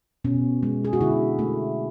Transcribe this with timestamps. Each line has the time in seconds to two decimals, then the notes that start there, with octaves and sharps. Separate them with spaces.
0.24 B2 C#4
0.63 G#3
0.85 G#4
0.93 F#4
1.01 D3 E4
1.39 A3